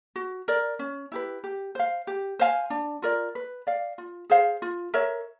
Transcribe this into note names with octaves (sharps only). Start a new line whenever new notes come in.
F#4
A#4 D5
C#4
E4 G4 B4
G4
C5 F5
G4
C5 F5 G#5
D4
F4 A#4 D5
B4
D5 F5
F4
G#4 C5 F5
F4
A#4 C#5 E5